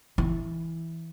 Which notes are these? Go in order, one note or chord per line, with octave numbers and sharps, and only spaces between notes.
E3